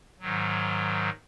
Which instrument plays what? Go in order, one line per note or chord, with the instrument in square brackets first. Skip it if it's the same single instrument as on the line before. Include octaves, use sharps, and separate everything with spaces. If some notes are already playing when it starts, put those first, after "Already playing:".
[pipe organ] G#2 D#3 F#3